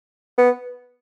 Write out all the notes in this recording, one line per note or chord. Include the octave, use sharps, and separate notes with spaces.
B3